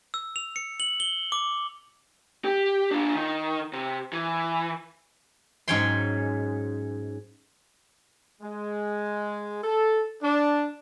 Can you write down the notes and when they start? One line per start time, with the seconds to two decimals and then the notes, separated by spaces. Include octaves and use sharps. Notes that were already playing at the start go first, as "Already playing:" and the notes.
0.14 E6
0.36 F7
0.56 C#7
0.80 F#7
1.00 G7
1.32 D6
2.45 G4
2.91 D4 F4
3.15 D#3
3.73 C3
4.13 E3
5.68 G#2 F#3 C#4 C#5 G5 C6
8.42 G#3
9.64 A4
10.22 D4